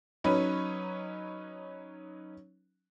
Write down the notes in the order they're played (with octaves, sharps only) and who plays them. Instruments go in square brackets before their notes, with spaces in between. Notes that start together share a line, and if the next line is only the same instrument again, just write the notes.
[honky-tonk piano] F#3 C#4 D#4 B4 C#5